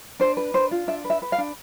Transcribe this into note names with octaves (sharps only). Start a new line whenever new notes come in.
D4 C5
B4
D4 C5
F4
D4 E5
B4
E5
B4
F5
D4